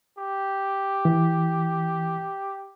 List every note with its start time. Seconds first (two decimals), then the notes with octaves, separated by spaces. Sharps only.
0.18 G4
1.05 E3